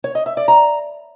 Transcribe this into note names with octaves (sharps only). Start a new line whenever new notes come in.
C#5
D#5
E5
D5
A#5